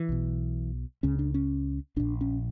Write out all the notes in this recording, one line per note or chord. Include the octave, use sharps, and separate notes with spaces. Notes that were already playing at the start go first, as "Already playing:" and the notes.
Already playing: E3
B1 B2
C#2 C#3 C#4
D4
C#4
A#1 A#2 D4
C#4